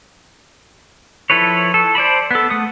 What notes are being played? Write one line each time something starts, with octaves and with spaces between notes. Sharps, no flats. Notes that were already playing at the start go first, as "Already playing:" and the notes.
F3 E4 A4 B4 C#5
A4
C5 D5 A5 B5
B3 A4
A3 F#5 D#6